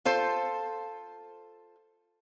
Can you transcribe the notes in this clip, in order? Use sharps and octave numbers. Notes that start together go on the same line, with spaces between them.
F4 A4 C5